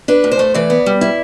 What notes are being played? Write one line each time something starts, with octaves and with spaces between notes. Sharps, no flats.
D4 B4
A2
C5
A3
E3 D5
B3
G3
E4